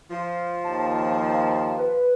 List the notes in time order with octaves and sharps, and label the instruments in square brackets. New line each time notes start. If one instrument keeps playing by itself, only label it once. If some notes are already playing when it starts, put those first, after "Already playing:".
[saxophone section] F3
[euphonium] D#2 [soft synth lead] A5
[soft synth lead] B4